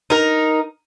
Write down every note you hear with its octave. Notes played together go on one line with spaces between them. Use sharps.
D#4 A#4